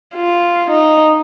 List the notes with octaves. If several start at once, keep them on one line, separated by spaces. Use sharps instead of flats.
F4
D#4